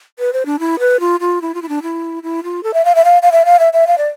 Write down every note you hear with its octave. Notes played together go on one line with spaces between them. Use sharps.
B4
C5
D4
E4
B4
F4
F4
E4
F4
E4
D4
E4
E4
F4
A4
E5
F5
E5
F5
F5
E5
F5
E5
E5
F5
D5